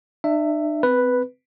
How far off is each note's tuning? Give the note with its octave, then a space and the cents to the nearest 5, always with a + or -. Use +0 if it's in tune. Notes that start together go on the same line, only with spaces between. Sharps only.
D4 +45 E5 +10
C4 -30 B4 +0